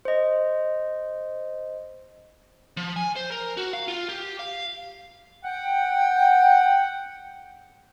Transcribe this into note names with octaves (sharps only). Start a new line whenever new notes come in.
C5 D#5
F3
G#5
C5
A#4
F#4
F5
F4
G4
F5
F#5 G5